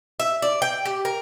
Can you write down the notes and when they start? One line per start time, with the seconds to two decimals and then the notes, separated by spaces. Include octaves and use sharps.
0.20 E5
0.42 D5
0.62 G5
0.85 G4
1.05 A#4